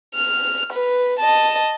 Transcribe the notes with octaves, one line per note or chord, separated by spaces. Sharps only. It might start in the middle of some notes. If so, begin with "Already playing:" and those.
F6
B4
D#5 A5